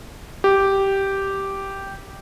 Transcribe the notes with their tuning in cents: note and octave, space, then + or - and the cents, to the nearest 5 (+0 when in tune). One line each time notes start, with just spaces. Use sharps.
G4 -5